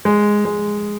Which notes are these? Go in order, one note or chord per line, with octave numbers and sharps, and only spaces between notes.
G#3
G#3